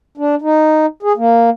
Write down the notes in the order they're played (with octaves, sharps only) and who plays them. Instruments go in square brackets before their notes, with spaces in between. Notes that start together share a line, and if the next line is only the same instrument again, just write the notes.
[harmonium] D4
D#4
G#4
A#3